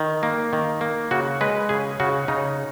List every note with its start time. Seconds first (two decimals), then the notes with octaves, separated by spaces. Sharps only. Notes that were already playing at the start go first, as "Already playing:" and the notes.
Already playing: D#3
0.23 A#3
0.53 D#3
0.81 A#3
1.11 C#3 F#4
1.41 G#3 B4
1.69 C#3 G#4
2.00 C#3 F#4
2.28 C#3 D#4